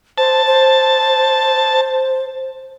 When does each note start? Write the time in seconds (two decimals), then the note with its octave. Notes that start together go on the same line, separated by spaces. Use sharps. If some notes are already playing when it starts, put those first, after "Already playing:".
0.18 C5 A5
0.47 C5